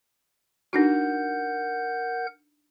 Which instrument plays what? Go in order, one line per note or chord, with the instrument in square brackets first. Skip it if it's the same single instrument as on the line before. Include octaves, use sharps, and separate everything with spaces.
[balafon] D4 D#4 F#4 [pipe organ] A#4 F#5 G6